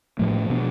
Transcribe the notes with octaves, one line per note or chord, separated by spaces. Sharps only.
A2 F3 A3
B2 B3 D4